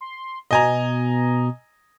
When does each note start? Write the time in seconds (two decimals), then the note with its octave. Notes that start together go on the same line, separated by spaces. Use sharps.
0.01 C6
0.51 B2 D#5 G#5 A#5